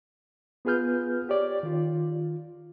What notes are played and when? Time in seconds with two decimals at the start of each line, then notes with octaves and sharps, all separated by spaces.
0.65 B3 F4 G#4 B4 F6 G6
1.29 G4 C#5 D5
1.63 D#3 F4